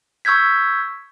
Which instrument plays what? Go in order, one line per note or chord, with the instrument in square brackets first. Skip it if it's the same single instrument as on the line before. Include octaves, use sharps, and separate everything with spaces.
[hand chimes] C#6 E6 G6 G#6 B6